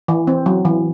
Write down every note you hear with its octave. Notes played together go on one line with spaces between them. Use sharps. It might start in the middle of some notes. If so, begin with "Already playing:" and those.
E3
C4
F#3
E3